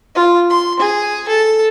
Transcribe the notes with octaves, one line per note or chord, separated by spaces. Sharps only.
F4
C6
G#4
A4